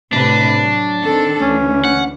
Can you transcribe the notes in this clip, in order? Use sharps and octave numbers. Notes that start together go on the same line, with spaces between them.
A2 C3 D4 B4
F#3
D#3 C4 A4
D2 E3 C#4
F#5